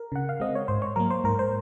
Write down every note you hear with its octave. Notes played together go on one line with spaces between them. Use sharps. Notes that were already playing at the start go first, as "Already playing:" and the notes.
Already playing: A#4
C#3 F#5
F5
G#3 C4 D#5
C#5
G#2 C5
C#5
F#3 A#3 A#4
C5
G#2 A#4
C5